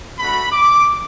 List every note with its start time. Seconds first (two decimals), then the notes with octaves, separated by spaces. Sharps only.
0.18 A3 D4 F#4 B5
0.51 D6